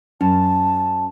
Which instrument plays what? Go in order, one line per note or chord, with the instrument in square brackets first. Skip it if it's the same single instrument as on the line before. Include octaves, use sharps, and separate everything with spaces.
[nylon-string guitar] F#2 [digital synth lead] C#4 [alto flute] A5